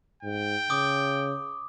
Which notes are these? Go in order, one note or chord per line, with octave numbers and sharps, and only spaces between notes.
G#2 G5
C#3 D6 D#6